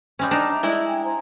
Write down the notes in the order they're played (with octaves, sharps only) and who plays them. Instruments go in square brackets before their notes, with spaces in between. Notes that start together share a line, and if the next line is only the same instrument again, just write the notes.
[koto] G3 G#3 C#4 [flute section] C#6
[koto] D4 D#4 [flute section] D5 G#5 F6
[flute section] E5 A#5
[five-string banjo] G#3 E4 [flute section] D5
[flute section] G5 G#5
C5 G#5 A#5